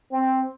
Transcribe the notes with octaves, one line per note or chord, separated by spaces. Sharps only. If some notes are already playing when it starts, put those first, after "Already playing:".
C4